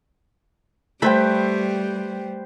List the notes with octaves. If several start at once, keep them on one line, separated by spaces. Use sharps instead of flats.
G3 A3 B4 C5 G5 B5